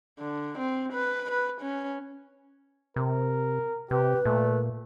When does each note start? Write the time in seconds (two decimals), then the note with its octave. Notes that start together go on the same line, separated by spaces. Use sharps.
0.19 D3
0.58 C4
0.93 B4
1.31 B4
1.61 C#4
2.96 C3 A#4
3.91 C3 G4 B4
4.25 A#2 A3